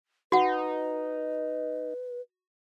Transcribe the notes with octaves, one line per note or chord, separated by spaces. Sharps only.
D#4 F#4 B4 F#5